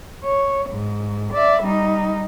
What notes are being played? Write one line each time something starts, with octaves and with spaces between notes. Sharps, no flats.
C#5
G#2
D5 E5
G3 D#4